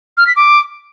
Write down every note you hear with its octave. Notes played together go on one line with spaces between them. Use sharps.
F6
B6
D6